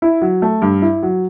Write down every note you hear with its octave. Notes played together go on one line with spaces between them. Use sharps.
E4
F#3
A3
G2
E4
F#3